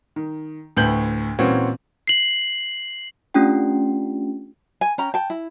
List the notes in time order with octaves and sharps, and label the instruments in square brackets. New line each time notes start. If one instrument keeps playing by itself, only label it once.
[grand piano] D#3
D2 A2 B4 G6 F#7
A#2 E3 C4 C#4 F#4
[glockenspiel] C7 F#7
[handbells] A3 C#4 D4 F4 G4 G5
[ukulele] G#5
C#4 G5 A#5
G5 A5
E4